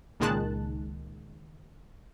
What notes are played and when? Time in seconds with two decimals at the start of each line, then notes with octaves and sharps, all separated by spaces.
0.20 C#2 A#2 D#3 G#3 A5 F#6